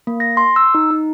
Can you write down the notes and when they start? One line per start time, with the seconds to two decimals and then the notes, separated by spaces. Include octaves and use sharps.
0.07 A#3
0.20 A#6
0.37 C6
0.56 E6
0.75 D#4
0.91 D#4